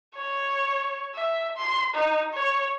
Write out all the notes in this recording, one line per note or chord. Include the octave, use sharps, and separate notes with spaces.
C#5
E5
C6
D#4
C#5